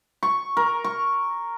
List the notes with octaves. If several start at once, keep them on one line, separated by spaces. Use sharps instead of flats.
C#6
A#4
C#6